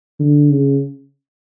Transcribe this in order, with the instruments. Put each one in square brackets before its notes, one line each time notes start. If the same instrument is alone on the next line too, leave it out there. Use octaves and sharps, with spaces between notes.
[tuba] D3
C#3